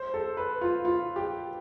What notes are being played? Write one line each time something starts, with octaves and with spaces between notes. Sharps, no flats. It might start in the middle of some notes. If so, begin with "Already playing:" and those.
Already playing: C5
A4
B4
F4
F4
G4